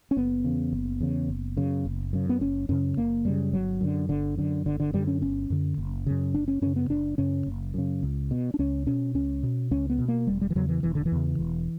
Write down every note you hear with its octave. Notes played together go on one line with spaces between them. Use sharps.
C#4
F#1 B3
E2 C#3
F#1
E2 C#3
F#1
F#2 C#3
F#1
F#2 C#3
B3
F#1 C#4
F#2 C#3 C#4
F#1 A#3
F#2 C#3 G3
G1 F#3
F#2 D3
G1 D3
F#2 D3
G1 D3
D3
F#2 D3 G3
C#4
G1 C#4
F#2 D3
F#1
F#2 C#3
F#1 D4
C#4
F#2 C#3 C#4
B3
F#1 D4
F#2 C#3 C#4
F#1
F#2 C#3
C#2
B2
D4
C#2 C#4
B2 C#4
C#2 C#4
B2
C#2 C#4
B3
B2
A#3
E1 G3
G3
E3
E2 C#3 F#3
E3
E1 E3
D3
E3
E2 C#3
E1